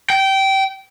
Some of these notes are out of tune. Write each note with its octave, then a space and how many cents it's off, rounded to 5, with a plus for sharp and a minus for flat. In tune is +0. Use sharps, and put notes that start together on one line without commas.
G5 -20